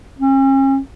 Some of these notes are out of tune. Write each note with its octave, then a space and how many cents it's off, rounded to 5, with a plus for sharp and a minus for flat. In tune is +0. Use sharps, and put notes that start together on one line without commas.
C#4 -40